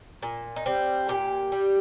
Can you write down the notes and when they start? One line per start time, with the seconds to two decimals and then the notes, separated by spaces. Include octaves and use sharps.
0.22 A#2
0.56 D#4
0.66 G3 C4
1.09 A#2 G4
1.52 G3